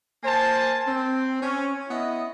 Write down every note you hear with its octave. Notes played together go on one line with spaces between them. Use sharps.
A#3 C5 G#5 A5
C4
C#4
B3 E4 D#5